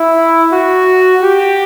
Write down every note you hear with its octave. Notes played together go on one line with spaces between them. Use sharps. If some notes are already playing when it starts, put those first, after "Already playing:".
Already playing: E4
F#4
G4